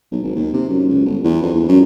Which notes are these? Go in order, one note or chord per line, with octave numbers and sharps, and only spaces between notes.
B1
G#1
D#2
C3
F#2
C#2
G1
E2
F2
E2
F#2